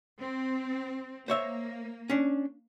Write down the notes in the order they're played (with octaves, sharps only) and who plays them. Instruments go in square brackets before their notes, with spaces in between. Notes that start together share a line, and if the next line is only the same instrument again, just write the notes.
[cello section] C4
[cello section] A#3 [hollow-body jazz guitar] C5 C#5 E5
[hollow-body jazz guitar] C#4 D4